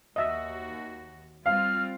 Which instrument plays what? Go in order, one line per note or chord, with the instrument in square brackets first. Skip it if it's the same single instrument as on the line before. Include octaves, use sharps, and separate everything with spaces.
[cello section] D#2 F#4 [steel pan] D#5 E5
[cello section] G3 C4 F4 [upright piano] F5 [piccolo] F6